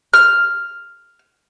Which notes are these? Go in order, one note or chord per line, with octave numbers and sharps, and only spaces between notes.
F6